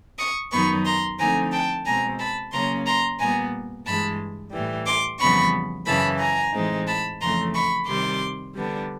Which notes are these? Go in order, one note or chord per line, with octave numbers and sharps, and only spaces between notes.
C#6 D#6
F#2 D#3 F#3 B3 D#4 B5 C#6
A#5 C6
D3 F3 A3 C4 D#4 G#5 A#5
G5 A5
B2 G#3 C4 G#5 A#5
A5 B5
C#3 F#3 A#3 C#4 A#5 C6
A#5 C6
A#2 G3 B3 G#5 A#5
G2 E3 G#3 A5 B5
A2 E3 G3
C6 D6
F2 C#3 E3 G3 B3 B5 C#6
F#2 C#3 E3 A5 B5
G#5 A#5
A2 E3 G#3 C4 D#4
A5 B5
F2 C#3 E3 A3 A#5 C6
B5 C#6
C3 D#3 G3 C6 D6
D3 G3 B3 D4